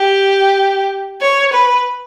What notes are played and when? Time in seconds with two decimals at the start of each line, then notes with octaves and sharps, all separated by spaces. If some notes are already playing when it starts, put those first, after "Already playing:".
Already playing: G4
1.21 C#5
1.53 B4